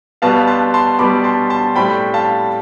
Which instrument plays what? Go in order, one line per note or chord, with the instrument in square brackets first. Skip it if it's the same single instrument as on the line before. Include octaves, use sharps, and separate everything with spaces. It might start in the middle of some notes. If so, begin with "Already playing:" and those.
[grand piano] B2 G3 B3 F5 A5
A5 C6
A5 C6
B2 G3 B3 B5 D6
A5 C6
A5 C6
A2 G3 C4 G5 B5
F5 A5